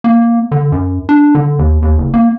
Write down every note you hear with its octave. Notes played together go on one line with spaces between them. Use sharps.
A#3
D3
F#2
D4
D3
D#2
D#2
F#1
A#3